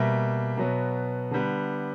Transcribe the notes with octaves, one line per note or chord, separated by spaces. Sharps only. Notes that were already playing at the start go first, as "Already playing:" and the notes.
Already playing: B2 G3 A#3 E5
B2 F#3 B3
D3 G3 B3